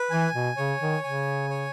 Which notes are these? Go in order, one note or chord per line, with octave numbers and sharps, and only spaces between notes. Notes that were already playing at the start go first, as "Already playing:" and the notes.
Already playing: B4
E3 G#5
B2
C#3 C#5
D#3
C#3 G#5
C#5